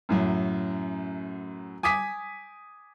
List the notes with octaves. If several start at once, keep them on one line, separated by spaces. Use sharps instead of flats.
F#2 A2 F#3
G#5 D6 D#6 B6